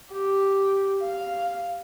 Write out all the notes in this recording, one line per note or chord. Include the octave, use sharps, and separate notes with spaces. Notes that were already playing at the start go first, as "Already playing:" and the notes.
G4
F5